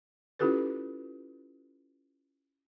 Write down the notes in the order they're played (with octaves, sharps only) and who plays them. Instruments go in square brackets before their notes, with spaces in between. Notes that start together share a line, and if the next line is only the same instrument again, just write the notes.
[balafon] C#4 E4 F4 G4 A4 B4